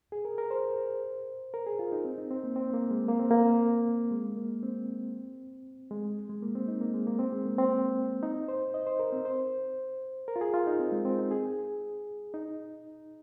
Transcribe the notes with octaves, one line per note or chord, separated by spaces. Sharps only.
G#4
A#4
A#4
C5
A#4
G#4
F4
D#4
C4
D#4
C4
A#3
C4
A#3
G#3
A#3
C4
A#3
G#3
A#3
C4
G#3
G#3
A#3
C4
D#4
A#3
G#3
A#3
C4
G#3
A#3
C4
D#4
C5
D#5
C5
A#4
C4
C5
A#4
F4
G#4
F4
D#4
C4
G#3
C4
D#4
G#4
D#4